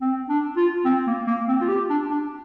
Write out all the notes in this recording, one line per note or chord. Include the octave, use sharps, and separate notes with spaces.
C4
D4
F4
C4
A#3
A#3
C4
F4
G4
D4
D4